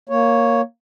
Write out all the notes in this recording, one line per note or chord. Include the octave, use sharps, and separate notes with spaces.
A#3 C#5